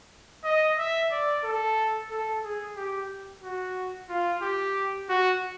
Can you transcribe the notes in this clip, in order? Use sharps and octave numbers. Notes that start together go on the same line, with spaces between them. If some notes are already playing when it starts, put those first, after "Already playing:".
D#5
E5
D5
A4
A4
G#4
G4
F#4
F4
G4
F#4